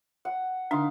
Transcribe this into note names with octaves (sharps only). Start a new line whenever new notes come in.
F#5
D3 D4 D#4 F5